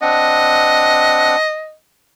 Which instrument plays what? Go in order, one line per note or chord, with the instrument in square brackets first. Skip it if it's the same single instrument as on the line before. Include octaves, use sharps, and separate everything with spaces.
[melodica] C4 D4 F#5 [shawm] D#5